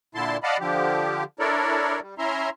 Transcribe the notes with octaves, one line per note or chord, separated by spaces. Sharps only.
A#2 D3 E4 A5 C6
D5 D#5 F5 F#5 A5 B5
D3 F3 G4
D4 E4 A4 A#4 C#5 D5
G3
C#4 E4 E5 A#5 C6